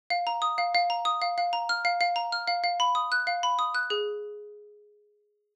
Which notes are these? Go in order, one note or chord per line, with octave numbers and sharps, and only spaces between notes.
F5
A#5
D#6
F5
F5
A#5
D#6
F5
F5
A#5
F6
F5
F5
A#5
F6
F5
F5
B5
D#6
F#6
F5
B5
D#6
F#6
G#4